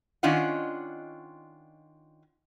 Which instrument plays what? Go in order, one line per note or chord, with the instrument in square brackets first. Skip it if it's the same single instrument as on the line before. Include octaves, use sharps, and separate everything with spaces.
[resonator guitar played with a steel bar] D#3 C#4 D4 F4 D#5 F#5